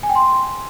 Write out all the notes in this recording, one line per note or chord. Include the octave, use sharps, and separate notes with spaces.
G#5
G5
C6